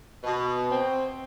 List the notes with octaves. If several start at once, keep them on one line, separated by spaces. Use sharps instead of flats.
B2
C4